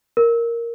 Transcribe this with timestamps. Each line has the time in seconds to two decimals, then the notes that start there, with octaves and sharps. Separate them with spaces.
0.17 A#4